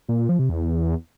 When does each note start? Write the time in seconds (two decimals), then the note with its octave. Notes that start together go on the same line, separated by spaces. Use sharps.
0.09 A#2
0.19 A#2
0.29 F3
0.39 C3
0.49 E2